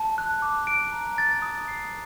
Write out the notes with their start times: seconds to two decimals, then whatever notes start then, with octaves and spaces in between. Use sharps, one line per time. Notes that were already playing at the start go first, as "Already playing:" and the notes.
Already playing: A5
0.18 F#6
0.42 D6
0.67 D7
0.92 A#5
1.18 A6
1.42 D#6
1.68 C7